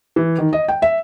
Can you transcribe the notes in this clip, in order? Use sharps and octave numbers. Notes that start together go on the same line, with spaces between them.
E3
D#3
D#5
G5
E5